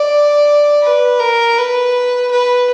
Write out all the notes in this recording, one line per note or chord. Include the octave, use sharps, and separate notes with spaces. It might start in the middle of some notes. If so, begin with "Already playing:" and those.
Already playing: D5
B4
A#4
B4
B4